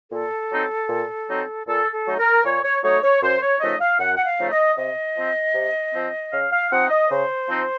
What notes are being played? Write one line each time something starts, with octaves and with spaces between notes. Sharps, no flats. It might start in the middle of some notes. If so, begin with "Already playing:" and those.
A#2 A4
F#3 C4 D#4
A#2
F#3 C4 D#4
A#2 A4
A4
F#3 A3 D#4
A#4
A#2 C#5
C#5
F#3 A3 D#4 C#5
C#5
F#2 C5
C#5
C#3 F3 A3 D#4 D#5
F5
F#2 F#5
F#5
F5
C#3 F3 A3 D#4
D#5
C3 D#5
F3 C4
C3
F3 C4
C#3 F5
F5
F3 C4 D#4 F#5
D#5
C#3 C5
F3 C4 D#4